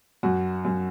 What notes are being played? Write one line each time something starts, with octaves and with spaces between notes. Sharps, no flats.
F#2 F#4
F#2